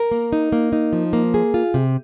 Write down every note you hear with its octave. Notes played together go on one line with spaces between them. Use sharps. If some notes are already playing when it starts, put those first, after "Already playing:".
Already playing: A#4
A#3
D#4
A#3
D#4
F3
A#3
G#4
F4
C3